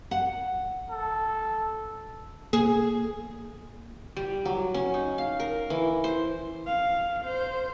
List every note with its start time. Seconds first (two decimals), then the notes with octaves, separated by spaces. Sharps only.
0.11 F#5
0.90 A4
2.53 A#3 G#4
4.17 G3
4.45 F#3
4.74 C#4
4.94 D#4
5.18 F5
5.40 A#4
5.70 E3
6.04 C5
6.67 F5
7.25 C5